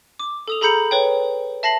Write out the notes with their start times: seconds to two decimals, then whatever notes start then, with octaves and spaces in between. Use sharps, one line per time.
0.19 D6
0.48 A4 D#6 F7
0.61 G#4 A4 A#5 B5 G6 C#7
0.91 B4 C#5 G5
1.63 E5 A5 A#6 C7 F#7